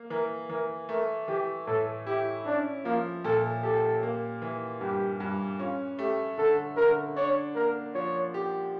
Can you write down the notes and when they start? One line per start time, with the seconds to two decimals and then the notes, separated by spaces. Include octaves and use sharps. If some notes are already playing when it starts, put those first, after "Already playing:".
Already playing: A#3
0.10 E3 A#4
0.50 E3 A#4
0.89 A3 A#4
1.28 E3 G4
1.67 A2 A4
2.07 E4 G4
2.45 C#4 D4
2.85 F3 A#3
3.24 A#2 A4
3.63 G4 A4
4.03 A#3
4.42 E3
4.81 G2 G4
5.20 G2
5.60 C#4 F4
5.99 A3 G4
6.38 D3 A4
6.77 D3 A#4
7.16 D4 C#5
7.55 A#3 A#4
7.94 F3 C#5
8.34 G4